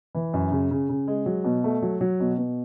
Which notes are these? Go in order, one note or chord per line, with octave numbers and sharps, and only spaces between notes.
E3
F#2
C#3
C#3
C#3
G#3
F#3
B2
A3
F#3
F#3
B2
B2